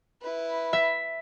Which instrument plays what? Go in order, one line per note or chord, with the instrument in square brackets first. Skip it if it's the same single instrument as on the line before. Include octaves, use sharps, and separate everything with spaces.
[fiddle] E4 B4
[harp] E5